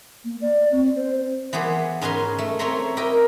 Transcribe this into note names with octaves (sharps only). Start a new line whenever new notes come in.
A#3
D5
C4
C5
E3 B3 G4 G#4 C5
G#2 C#4 B4 D#5 G#5 C6
A3
A3 C4 C#5 E5 A#5 C6
E4 G4 A#4 D#5 G5